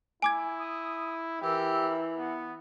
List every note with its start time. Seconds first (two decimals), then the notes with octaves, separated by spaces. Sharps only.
0.22 E4 G#5 D6 G#6
0.57 D#6
1.41 E3 G4 A#4 E6
2.18 B3 F#5